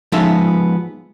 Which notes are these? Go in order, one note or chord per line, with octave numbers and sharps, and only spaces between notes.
F3 G#3 B3 D#4 F4 E5